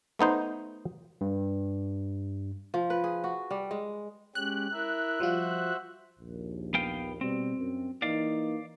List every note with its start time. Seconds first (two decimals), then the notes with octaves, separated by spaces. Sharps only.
0.19 A3 B3 D#4 C5
1.21 G2
2.74 F3
2.90 B4
3.04 G#4
3.24 F#4
3.51 G3
3.71 G#3
4.35 G#3 C#4 G4 F#6
4.73 E4 A#4 E5
5.20 F3 G3 F4 F#4 C5 E5
6.18 A#1 D#2
6.74 B3 F5 G5
7.21 B2 G3 C4
7.57 F#2
8.02 E3 A#3 D#4 D5 F5